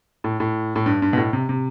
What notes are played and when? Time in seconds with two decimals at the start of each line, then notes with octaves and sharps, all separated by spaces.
0.24 A2
0.40 A2
0.76 A2
0.86 G2
1.02 G2
1.13 B2
1.17 A2
1.33 C3
1.49 C3